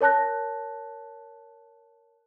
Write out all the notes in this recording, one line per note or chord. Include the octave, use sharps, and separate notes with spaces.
A#4 C#5 A5 F#6 A#6